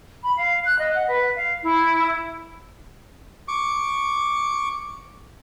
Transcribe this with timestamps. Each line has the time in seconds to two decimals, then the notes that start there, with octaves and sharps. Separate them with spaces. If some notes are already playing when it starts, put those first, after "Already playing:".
0.23 B5
0.36 F5
0.64 F#6
0.78 D#5
0.95 F#5
1.08 B4
1.35 F5
1.62 E4
3.48 C#6 D6